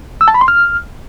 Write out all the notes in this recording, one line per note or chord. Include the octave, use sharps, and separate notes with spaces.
E6
A5
B5
C6
F6